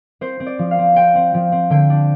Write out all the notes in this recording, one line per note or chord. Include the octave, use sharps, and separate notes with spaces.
C4 C5
C4
D5
F3
F5
C4
C4 G5
C4
F3
C4
D3 G5
D4